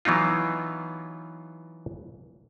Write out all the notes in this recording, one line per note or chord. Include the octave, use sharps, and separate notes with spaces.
E3 F#3 B3 D#4 F4